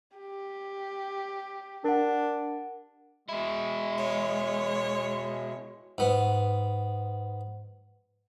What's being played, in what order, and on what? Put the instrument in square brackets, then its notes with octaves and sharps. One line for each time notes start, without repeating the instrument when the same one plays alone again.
[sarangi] G4
[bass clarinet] D4 [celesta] A#4 F#5
[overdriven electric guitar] B2 E4 [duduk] G#3
[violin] C#5
[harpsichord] G#2 B3